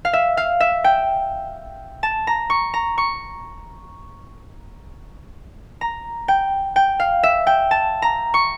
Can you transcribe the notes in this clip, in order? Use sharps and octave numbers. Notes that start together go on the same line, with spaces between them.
F5
E5
F5
E5
G5
A5
A#5
C#6
A#5
C#6
A#5
G5
G5
F5
E5
G5
A5
A#5
C#6